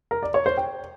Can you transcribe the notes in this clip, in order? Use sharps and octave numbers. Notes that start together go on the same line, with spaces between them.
A#4
D5
C#5
C5
G5